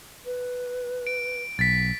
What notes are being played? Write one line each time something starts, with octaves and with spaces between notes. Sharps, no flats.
B4
D7
B1 A6 B6